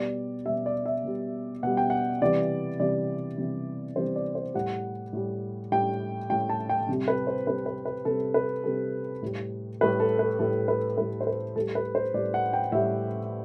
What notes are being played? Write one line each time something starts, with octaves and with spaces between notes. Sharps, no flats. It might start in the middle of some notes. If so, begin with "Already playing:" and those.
Already playing: B2 G3 D5
B2 G3 E5
D5
E5
B2 G3
B2 G3 F#5
G5
F#5
C3 E3 G3 D5
C3 E3 G3 D5
C3 E3 G3
C3 E3 G3 C5
D5
C5
A2 G3 F#5
A2 G3
A2 G3 G5
A2 G3 G5
A5
G5
C3 G3
B4
C5
C3 G3 B4
B4
B4
C3 G3 A4
B4
C3 G3 A4
A2 G3
A2 G3 B4
A4
B4
A2 G3 A4
B4
A2 G3 B4
C5
B4
A2 G3 A4
B4
C5
A2 G3 D5
F#5
G5
A2 G3 E5